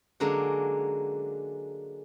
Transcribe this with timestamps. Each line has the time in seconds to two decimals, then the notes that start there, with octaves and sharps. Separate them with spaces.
0.20 D3 F#3 G#3 A#3 C#4 D4